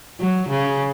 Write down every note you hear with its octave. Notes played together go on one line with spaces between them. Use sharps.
F#3
C#3